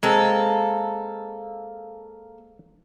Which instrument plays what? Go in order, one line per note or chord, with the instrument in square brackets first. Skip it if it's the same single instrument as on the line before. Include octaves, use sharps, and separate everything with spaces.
[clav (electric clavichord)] G#3 C4 [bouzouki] A#3 A4